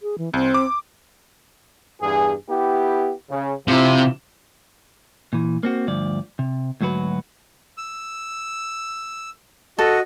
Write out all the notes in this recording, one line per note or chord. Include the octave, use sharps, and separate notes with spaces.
G#4
E3
C2 C4
D6
E2 G2 G#4
B3 E4 G4
C#3
C3 F3 E4 F4
A#2 E3
A#3 C4 F#4
D2 G2 F3 D5
C3
D2 G#2 F#3 F#4 B4
E6
F#4 A4 D#5